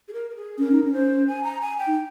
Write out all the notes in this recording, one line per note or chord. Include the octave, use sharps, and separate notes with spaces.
G#4
A#4
A#4
G#4
C#4 A#4
D#4
C#4
C5
G#5
A#5
G#5
G5
D#4